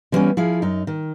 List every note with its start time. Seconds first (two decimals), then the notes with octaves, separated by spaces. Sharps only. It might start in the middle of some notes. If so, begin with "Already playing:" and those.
0.12 D3 E3 G3 A#3 B3 C#4
0.37 F3 E4 G#4 F5
0.62 F#2 D#4
0.87 D#3